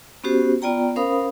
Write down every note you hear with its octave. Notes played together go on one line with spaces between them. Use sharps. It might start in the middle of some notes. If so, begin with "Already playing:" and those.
B3 C#4 F#4 G4 C5
B3 F4 D5 G5 A#5
C#4 A#4 C5 F5 B5 D#6